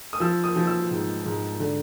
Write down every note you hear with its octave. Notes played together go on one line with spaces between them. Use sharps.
D#6
F3 E6
D#6
F3
E6
G#2
G#2
D3